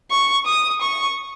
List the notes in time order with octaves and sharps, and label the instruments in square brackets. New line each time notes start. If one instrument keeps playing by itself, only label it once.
[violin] C#6
D#6
C#6